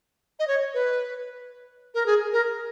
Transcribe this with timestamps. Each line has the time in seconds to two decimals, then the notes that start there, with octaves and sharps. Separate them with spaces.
0.39 D#5
0.48 C#5
0.74 B4
1.94 A#4
2.06 G#4
2.33 A#4